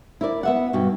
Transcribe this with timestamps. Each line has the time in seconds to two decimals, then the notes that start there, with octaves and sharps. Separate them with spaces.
0.21 E4 A#4 D5
0.43 B3 E5 F#5
0.73 G2 B2